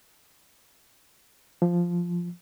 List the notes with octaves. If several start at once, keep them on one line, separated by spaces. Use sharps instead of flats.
F3